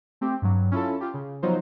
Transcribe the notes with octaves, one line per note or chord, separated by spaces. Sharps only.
A3 C4 G4
G2 F#3
C#4 E4 F4 A4
F4 G4
C#3
F3 F#3 B3 D#4 F4 C5